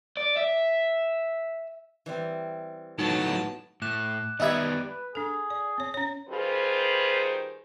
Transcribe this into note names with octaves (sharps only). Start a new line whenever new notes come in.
D5
E5
E3 G3 C4
A2 F#3 B3 D#4 A5
A2 D6 F#6 E7
D#3 G3 B3 D#5 E5 G#6
B4
D4 G#4 A4
D5
C4 C#5
C#4 C#5
D#3 G3 F4 G#4 B4 C5